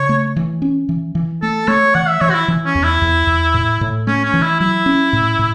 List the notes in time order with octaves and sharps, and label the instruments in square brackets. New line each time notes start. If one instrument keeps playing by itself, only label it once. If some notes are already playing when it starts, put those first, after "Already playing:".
Already playing: [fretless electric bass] C#3 [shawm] C#5
[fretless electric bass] A3
E3
C#4
E3
E3
[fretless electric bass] A3 [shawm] A4
[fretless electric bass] A3 [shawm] C#5
[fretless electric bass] E3 [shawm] F#5
[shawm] E5
[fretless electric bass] E3 [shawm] C#5
[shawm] F#4
E4
[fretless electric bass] E3
[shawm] C#4
[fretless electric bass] E2
[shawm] E4
[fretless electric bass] E2
E2
A2
A2
[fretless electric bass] A3 [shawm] C#4
[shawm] C#4
[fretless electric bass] E3
[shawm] E4
[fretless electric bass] F#3 [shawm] E4
[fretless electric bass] C#4
A2
A2